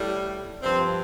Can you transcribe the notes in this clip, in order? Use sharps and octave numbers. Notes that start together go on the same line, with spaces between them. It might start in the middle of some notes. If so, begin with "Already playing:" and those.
Already playing: A2 G3
G2 F3 C4